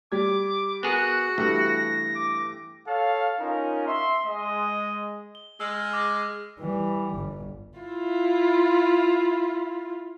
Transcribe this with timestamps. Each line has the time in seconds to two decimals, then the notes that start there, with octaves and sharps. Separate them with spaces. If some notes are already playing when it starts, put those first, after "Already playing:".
0.12 G3 G4 D6 G#6
0.83 B3 F#4 G#4 A#4 F#6
1.38 G2 E3 A3 G4 A#6
2.15 D6
2.87 A4 C#5 F5
3.39 C#4 D#4 F4 A#4
3.87 E5 C6
4.25 G#3 D#5
5.35 G7
5.60 G#3 E6 F6
5.93 D6 A#6
6.60 E3 G3
7.14 G1
7.79 E4 F4